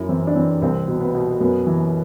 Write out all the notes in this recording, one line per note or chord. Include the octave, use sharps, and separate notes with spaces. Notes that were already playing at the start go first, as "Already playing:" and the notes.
Already playing: F#2 E4
E3 C4
D4
E3 C4
C2 C4
B2
B3
B2
F#2 B3
E3